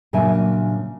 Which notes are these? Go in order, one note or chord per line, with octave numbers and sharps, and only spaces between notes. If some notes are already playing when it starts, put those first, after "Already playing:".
A#2 C#3 F#3 D4 E5 G#5